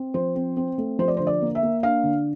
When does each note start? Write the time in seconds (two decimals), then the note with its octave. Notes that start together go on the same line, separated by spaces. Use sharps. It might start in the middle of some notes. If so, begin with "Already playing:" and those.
Already playing: C4
0.14 F3 C5
0.35 C4
0.57 C4
0.78 A3
0.99 F3 C5
1.08 D5
1.17 C5
1.20 D3
1.27 D5
1.41 A#3
1.55 E5
1.62 A#3
1.83 D4 F5
2.04 D3